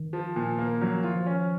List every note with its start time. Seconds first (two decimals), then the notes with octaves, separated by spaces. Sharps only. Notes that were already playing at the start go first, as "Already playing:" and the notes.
Already playing: D#3
0.13 F3
0.36 A#2
0.58 A#3
0.81 F3 F#3
1.04 F4
1.16 F3
1.26 C#4